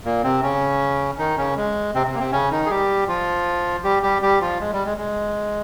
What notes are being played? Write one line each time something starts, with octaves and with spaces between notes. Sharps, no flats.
A#2 A#3
C3 C4
C#3 C#4
D#3 D#4
C#3 C#4
G#3
C3 C4
C3 C4
A#3
C3 C4
C#3 C#4
D#3 D#4
G#4
G3 G4
F3 F4
G3 G4
G3 G4
G3 G4
F3 F4
G#3
G3
G#3
G#3